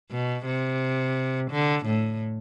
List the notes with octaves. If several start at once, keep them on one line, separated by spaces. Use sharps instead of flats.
B2
C3
D3
A2